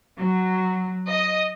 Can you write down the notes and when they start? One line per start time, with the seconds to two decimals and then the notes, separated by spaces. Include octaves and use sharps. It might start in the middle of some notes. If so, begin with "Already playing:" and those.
0.17 F#3
1.08 D#5